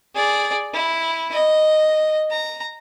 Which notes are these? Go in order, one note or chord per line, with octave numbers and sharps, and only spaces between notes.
G#4 D5
E4
D#5
A#5